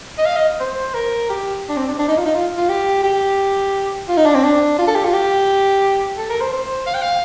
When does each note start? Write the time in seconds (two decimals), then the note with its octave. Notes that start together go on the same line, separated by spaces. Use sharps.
0.18 D#5
0.26 F5
0.36 D#5
0.60 C5
0.95 A#4
1.30 G4
1.69 D4
1.77 C4
1.88 D4
1.99 D4
2.08 D#4
2.17 F4
2.26 D#4
2.35 F4
2.57 F4
2.69 G4
3.04 G4
4.08 F4
4.17 D#4
4.26 D4
4.35 C4
4.44 D4
4.79 F4
4.87 A4
4.95 G4
5.04 F4
5.14 G4
6.18 A4
6.30 A#4
6.41 C5
6.53 C5
6.87 F5
6.94 G5
7.02 F5